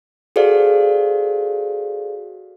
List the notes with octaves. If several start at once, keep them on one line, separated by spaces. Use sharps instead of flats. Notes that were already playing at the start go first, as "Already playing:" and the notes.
F#4 G#4 A4 C5 D5 F5